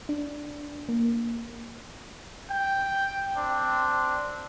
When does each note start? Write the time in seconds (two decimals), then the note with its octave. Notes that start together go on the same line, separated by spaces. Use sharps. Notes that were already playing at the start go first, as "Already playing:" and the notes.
0.09 D4
0.89 A#3
2.50 G5
3.38 C4 D4